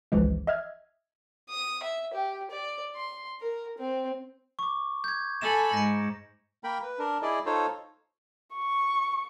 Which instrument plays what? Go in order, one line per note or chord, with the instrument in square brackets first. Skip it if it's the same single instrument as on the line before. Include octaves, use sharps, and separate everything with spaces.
[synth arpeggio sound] G#1 C#2 F#2 E3 F3 G#3
D#5 E5 F6 G#6
[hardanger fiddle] D#6
E5
G4
D5
C6
A#4
C4
[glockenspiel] C#6 D6
G6 G#6
[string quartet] A4 G#5 B5 [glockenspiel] E7
[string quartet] G#2 [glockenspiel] A#6 C#7
[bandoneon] A#3 A#4 G5 B5
B4
D4 A#4
E4 G#4 D5 D#5
D#4 F4 A4 C5 C#5
[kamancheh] C#6